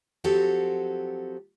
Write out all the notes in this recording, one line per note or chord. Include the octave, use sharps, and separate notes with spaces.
F3 F#3 C4 F#4 G4 A4